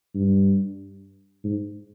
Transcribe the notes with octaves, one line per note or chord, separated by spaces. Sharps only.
G2
G#2